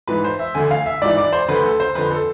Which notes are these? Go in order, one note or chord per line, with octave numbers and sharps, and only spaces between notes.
G#2 E3 B4
C5
E5
D2 D3 G#5
F5
E5
G#2 E3 D5
D5
C5
D2 D3 B4
A4
C5
F2 D3 B4
A4